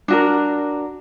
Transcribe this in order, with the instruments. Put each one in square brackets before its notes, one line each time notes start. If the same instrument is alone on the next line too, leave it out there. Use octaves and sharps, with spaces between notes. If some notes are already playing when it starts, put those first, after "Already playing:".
[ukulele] D4 F#4 A#4